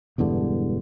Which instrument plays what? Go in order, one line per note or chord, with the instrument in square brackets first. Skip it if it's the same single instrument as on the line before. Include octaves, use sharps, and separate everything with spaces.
[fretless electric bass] E1 E2 G2 D3